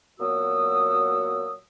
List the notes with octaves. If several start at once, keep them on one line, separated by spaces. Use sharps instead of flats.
A#2 F#3 B3 F#4 D#6 E6